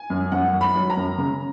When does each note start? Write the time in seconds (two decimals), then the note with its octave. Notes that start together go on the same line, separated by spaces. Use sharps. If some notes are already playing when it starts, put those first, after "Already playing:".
Already playing: G#5
0.10 F#2
0.32 F#2 F#5
0.53 F#2
0.61 B5
0.75 F#3
0.90 A#5
0.97 F#2
1.18 C#3